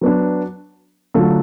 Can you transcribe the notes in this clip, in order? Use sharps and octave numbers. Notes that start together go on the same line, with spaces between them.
F#3 B3 D4
D3 F#3 A3 F4 A4